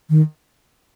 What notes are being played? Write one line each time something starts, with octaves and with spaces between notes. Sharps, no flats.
D#3